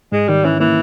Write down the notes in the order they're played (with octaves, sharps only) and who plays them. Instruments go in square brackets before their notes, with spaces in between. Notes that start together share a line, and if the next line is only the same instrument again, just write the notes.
[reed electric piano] G#2 [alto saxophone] G#3
[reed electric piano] D#3 [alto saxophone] G3
[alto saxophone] E3 [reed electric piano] C#4
[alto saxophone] E3 [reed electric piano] A#3